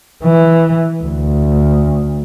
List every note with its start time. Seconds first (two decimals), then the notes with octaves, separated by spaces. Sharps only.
0.23 E3
1.04 D2